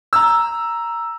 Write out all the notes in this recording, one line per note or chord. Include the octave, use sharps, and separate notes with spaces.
A#5 E6